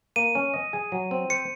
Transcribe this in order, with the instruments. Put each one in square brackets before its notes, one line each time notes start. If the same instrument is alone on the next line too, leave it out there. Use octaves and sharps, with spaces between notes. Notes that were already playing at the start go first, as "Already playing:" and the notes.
[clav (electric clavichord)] A#3 [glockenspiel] D#7
[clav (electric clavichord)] C#4
D#5
G#4
F#3
C4
[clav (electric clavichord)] C5 [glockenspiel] C#7